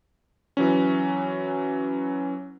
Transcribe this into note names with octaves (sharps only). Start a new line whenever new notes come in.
E3 F#3 C#4